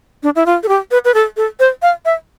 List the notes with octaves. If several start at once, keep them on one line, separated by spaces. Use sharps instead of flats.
D4
E4
F4
A4
G4
B4
B4
A4
A4
C5
F5
E5